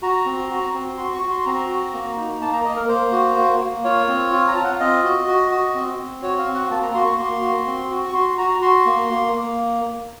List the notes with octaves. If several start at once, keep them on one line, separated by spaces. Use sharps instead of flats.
F#4 A#5
C4
F#4
C4
F#4 C6
C#6
F#4
C6
C6
C4 A#5
F#4
A#3
D#4
A#3 A5
A#5
A#3 D#5
A#4
A#3 C5
F#4
A#3
A#3
F4 C#5
C4
F4
A#5
F4 A5
F#5
F5
C4 D#5
F#4
F#4
F#4
C4
C4
F#4 C#5
F5
C4
F#5
A#3 A5
A#5
F#4 C6
C#6
A#3 C6
F#4
C4
F#4
C#6
F#4 C6
F#4 A#5
F#4 C6
A#3
A#3
A#3